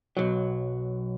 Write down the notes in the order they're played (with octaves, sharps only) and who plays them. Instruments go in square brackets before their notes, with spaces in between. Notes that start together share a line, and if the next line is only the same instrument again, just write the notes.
[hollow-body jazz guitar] B1 F#3